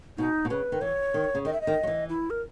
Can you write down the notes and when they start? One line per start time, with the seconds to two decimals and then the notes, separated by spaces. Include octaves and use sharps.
0.18 B2 D#4
0.45 B2
0.50 C#3 B4
0.72 D#3
0.81 E3 C#5
1.14 D#3
1.35 C#3
1.45 D#3 D#5
1.53 E5
1.61 D#5
1.67 D#3
1.83 F#3
1.87 E3
2.09 E4
2.30 A#4